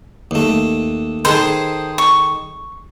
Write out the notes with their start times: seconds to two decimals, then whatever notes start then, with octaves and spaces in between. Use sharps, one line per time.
0.31 D#2 A3
1.25 D#3 G#4 A4 C5
1.98 C#6